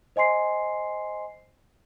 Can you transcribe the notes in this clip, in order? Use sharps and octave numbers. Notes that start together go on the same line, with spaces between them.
C5 D#5 G#5 C6 C7